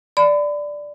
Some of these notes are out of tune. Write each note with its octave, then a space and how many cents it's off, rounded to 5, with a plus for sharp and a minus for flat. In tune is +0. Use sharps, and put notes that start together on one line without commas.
D5 +0 B5 +35